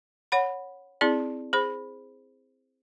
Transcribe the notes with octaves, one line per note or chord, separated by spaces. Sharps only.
C#5 F#5 B5
C4 E4 G#4 D5
G#4 C5 B5